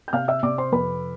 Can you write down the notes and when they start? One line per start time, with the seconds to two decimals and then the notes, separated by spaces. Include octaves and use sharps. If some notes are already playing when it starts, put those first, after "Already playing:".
0.08 G6
0.13 C3 F5 F6
0.28 E5 E6
0.43 C3 D5 D6
0.58 C5 C6
0.72 F2 B4 B5